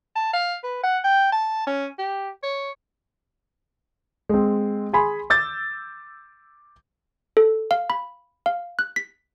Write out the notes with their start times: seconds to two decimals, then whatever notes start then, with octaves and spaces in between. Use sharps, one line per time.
0.16 A5
0.33 F5
0.64 B4
0.83 F#5
1.04 G5
1.32 A5
1.67 C#4
1.99 G4
2.43 C#5
4.29 G#3 C4
4.93 G#4 G#5 B5 C6
5.30 D6 E6 G6 A6
7.37 A4
7.71 F5
7.90 B5
8.46 F5
8.79 F#6
8.96 B6